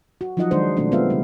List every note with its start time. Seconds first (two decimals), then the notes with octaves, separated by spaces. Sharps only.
0.21 F#4
0.37 F3 F#3 D#4 F4 D#5 F#5
0.51 D#3 F#3 G#3 D4 C5
0.77 B2 D#3 A3 C4 D4
0.92 G#3 B3 C4 F4 E5 F5
1.10 C#3 G3